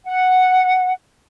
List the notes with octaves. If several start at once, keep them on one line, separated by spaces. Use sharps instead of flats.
F#5